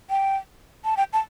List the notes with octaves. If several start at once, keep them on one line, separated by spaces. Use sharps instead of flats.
G5
A5
G5
A5